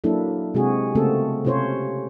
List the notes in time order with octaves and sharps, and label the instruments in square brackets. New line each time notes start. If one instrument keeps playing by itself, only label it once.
[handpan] F#3 A#3 D4 E4 A4
C3 G#3 C4 F#4 G#4
C#3 A3 A#3 C4 F#4 A4
C3 C#4 F4 C5 C#5